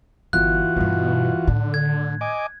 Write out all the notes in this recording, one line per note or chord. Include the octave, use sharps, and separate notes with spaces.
G1 E3 F4 F#4 F#6
G2 B2 G3
A2 D3 D#3
G#6
D#5 G#5 D6